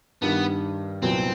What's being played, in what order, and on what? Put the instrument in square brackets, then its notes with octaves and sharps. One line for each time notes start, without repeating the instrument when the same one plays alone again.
[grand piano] G2 D#3 G3 [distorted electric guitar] B3
[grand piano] C2 A#2 F#3 B3 [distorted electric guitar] C4